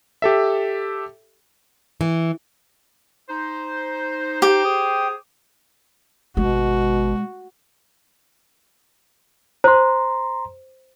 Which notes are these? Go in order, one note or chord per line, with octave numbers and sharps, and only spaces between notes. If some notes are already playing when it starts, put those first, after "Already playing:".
G4 A4 E5
E3
D#4 C5
G4
G#4 C5 D#6
G#1 B2 G#3 F#4
C5 A#5 C6